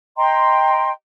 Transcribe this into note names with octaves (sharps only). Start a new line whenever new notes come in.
D#5 G5 A#5 C6